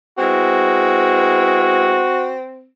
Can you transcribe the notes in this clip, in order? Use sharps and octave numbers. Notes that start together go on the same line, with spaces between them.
G#3 B3 C4 E4 F#4